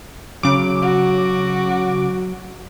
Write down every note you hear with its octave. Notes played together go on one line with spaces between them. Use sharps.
C#3 F#3 D6
F#4